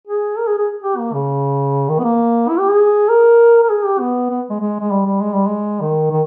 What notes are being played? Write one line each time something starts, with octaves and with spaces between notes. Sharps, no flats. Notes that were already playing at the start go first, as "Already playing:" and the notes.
G#4
A#4
G#4
G#4
G4
A#3
C#3
D#3
B3
A#3
E4
G4
G#4
A#4
A#4
G#4
G4
B3
B3
G#3
G#3
G#3
G3
G3
G#3
G3
G#3
D#3
D#3